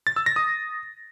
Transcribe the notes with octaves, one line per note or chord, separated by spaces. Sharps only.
A6
E6
A#6
D#6